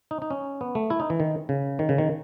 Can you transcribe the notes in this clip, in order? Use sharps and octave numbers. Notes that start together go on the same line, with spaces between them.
D#4
D#4
C#4
B3
A3
E4
D#4
E3
D#3
C#3
D#3
C#3
D#3